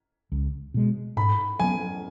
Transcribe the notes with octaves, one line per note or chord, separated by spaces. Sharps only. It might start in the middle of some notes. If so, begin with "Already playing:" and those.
C#2
B2 G#3
G#2 B5
F#3 B3 G#5